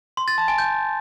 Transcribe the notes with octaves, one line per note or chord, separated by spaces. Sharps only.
C6
A6
A5
G#5
G6